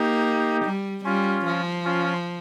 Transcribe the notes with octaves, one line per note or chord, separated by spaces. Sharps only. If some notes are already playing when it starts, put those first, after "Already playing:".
Already playing: A#3 D#4 G4
G3
G3 C#4 F4
F3
C#4 F4